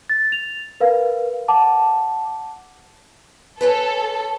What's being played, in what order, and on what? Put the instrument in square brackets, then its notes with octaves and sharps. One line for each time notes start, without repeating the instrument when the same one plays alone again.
[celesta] A6
F7
A#4 B4 F5
F#5 A5 D6
[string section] A4 [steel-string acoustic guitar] B4 C#5 G#5